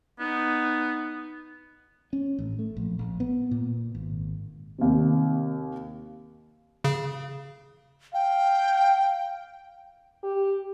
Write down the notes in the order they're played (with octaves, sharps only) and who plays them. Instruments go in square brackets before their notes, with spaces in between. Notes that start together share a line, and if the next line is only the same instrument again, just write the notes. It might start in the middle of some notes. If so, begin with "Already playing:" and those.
[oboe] B3 [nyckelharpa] D#4
[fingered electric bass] C#4
A1
A3
A#1
A#1
B3
A#2
G#1
[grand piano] D#2 C3
[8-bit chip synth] C#3
[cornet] F5 [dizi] G5
[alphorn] G4